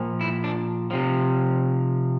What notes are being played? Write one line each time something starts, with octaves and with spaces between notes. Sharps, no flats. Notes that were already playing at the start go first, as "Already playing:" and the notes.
Already playing: A#2 F3
E4
D4
C3 F3